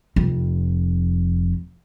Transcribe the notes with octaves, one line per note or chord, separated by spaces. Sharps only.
F1 F2